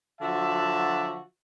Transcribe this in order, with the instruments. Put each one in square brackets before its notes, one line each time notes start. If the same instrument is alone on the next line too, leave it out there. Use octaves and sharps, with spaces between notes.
[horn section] D3 F3 F#3 F#4 E5 A5